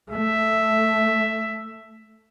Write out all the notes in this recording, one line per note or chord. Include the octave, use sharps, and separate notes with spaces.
A3 E5